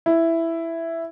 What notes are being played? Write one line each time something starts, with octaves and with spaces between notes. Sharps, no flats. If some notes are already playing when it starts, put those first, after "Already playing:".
E4